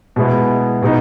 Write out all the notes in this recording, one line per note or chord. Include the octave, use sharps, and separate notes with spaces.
B2 G#3 B3 E4
B2 G#3 B3 D#4